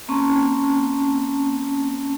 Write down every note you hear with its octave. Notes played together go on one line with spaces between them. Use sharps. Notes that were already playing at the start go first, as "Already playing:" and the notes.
A#3 C4 C#4 A5 C#6